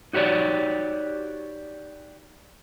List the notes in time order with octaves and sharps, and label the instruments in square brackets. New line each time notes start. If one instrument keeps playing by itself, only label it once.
[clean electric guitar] D#4 F#4 G4 C#5 D5